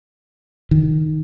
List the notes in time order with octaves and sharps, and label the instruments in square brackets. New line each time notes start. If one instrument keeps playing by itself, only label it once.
[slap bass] D#3